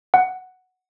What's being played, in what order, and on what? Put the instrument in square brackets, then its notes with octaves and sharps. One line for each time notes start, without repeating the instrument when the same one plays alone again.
[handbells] F#5